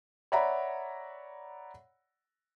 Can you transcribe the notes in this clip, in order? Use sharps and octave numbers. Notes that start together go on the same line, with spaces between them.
C#5 D5 E5 F#5 A#5 B5